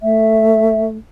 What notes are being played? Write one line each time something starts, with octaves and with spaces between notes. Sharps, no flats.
A3 E5